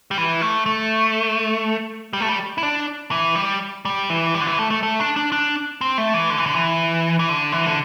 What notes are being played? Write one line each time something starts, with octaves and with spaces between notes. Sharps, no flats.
G3
E3
A3
A3
G3
A3
G3
E4
D4
E3
G3
G3
E3
G3
D3
E3
A3
A3
A3
D4
D4
D4
C4
A3
E3
D3
E3
D3
E3
E3
D3
E3
D3